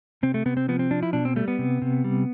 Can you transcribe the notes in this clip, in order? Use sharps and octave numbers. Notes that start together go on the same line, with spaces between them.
C3 C4
A3
C3 B3
C4
F3 B3
C4
F3 D4
E4
B2 D4
C4
G3 A3
B3
C3
C3
G3